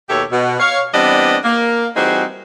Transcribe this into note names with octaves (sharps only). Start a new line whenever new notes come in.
D#2 B2 G4 A4 C#5 E5
B2
C#5 F5
E3 G3 B3 C4 D4 D#5
A#3
E3 G3 C4 D#4 F#4 G#4